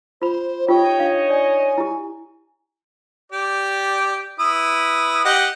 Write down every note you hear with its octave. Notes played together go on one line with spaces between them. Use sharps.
F4 C5 B5
D#4 F4 G4 C#5 D#5 G5
D4 F5
D5 G#5
E4 G4
G4 D5
E4 B4 D#6
G4 D#5 F#5